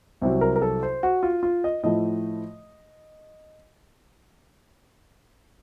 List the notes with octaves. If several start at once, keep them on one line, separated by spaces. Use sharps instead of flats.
C2 C3 F#3
A#4
A#4
A4
C5
F#4
F4
F4
D#5
A2 F3 A3 D#5